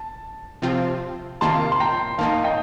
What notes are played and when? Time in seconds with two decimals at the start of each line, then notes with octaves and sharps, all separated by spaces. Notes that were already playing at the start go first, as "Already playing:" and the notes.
Already playing: A5
0.62 C3 F3 C4 F4
1.41 C3 D#3 A#3 F4 A5 C6
1.72 C6
1.80 G5 A#5
2.18 D#3 A#3 D#4 F5 A5
2.44 D#5 G5